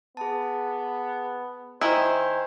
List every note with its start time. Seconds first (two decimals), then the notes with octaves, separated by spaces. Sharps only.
0.17 B3 G#4 A5
1.81 D#3 E4 C5 G5 G#5 B5